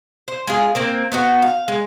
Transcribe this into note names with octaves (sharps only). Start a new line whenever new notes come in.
C5
G#3 F4 G#4
A#3 C4 A#4
B3 D#4 F#4
F5
G#3